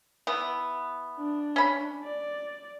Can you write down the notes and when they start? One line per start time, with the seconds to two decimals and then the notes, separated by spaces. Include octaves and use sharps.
0.27 E3 B3
1.19 D4
1.56 C#4 B5
2.03 D5